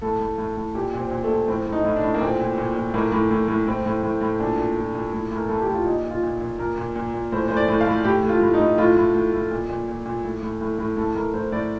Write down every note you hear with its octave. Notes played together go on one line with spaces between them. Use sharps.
A2 A4
A2
A2
A2
A#2 G4
A#2
C4
A#2
A3
A#2
A2 C4
A2
D#4
A2
D4
A2
A#3
A#2 C4
A#2
A#2
A#2
A2 A#3
A2
A2
A2
A2 C4
A2
A2
A2
A#2 D4
A#2
A#2
A#2
A2
A2 A#4
A2 A4
G4
A2
F4
A#2 D#4
A#2
F4
A#2
A#2
A#2 A#4
A#2
A#2
A#2
A2 C5
A2 C5
D5
A2
F5
A2
A2 G4
A2
F4
A2
D#4
A2
A2 F4
A2
A2
A2
A#2
A#2
A#2
A#2
A2
A2
A2
A2
A2 A4
A2 A#4
A2 C5
A2 D5